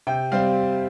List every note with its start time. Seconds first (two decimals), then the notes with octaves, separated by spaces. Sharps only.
0.07 C3 G5
0.32 G3 C4 F5